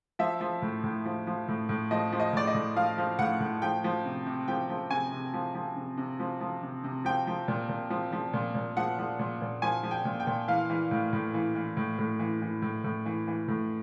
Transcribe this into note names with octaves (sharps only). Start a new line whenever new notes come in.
F3 E5
F3
A2
A2
F3
F3
A2
A2
F3 D#5
F3
D#5
A2 D5
D#5
A2
F3 F5
F3
A2 F#5
A2
F3 G5
F3
C3
C3
F3 G5
F3
C3 G#5
C3
F3
F3
C3
C3
F3
F3
C3
C3
F3 G5
F3
A#2
A#2
F3
F3
A#2
A#2
F3 F#5
F3
A#2
A#2
F3 G#5
F3
G5
A#2
G5
A#2
E3 F5
E3
A2
A2
E3
E3
A2
A2
E3
E3
A2
A2
E3
E3
A2